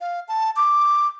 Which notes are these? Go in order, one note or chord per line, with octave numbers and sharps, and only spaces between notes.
F5
A5
D6